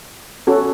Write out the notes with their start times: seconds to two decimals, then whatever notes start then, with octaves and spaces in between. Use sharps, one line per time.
0.47 C#4 F#4 A4